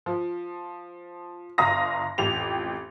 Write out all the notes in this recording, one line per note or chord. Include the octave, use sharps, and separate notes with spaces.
F3
G1 F5 A#5 D#6 A#6
A1 F2 G4 F7